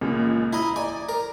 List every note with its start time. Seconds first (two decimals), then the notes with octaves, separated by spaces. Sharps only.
0.01 C#2 A#2
0.53 E4 D#5 A#5
0.76 D5 G#5
1.09 A#4